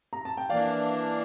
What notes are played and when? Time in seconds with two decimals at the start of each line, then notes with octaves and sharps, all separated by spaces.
0.13 A#5
0.25 A5
0.37 G5
0.50 E3 A#3 D4 D5 F5